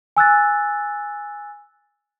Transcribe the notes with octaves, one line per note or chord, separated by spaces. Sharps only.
G#5 E6 F#6 A6